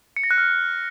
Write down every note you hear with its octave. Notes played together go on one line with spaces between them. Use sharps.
C#7
A#6
F#6
F6